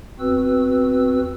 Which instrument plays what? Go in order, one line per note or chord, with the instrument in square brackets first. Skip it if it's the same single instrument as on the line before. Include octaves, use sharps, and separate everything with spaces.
[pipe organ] E2 C4 F#4 B4 E6